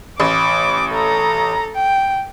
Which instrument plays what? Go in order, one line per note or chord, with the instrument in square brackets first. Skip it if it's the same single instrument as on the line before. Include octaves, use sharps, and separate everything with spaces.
[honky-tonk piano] A1 [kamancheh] D6
[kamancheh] A4 A#5
G5